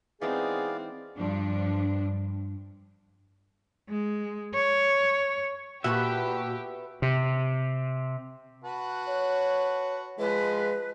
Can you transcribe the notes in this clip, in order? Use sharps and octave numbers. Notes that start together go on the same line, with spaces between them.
E3 G#3 B3 C4 D#4 G#4 D5 F5
G2 F3 D4
G#3
C#5
A#2 B3 F#4 G4 A4 B4 E5
C3
F#4 B4 A5
C#5
F3 G#3 B4